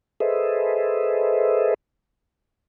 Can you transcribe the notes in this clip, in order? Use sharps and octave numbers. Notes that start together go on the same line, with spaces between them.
G#4 A4 B4 C5 D#5 E5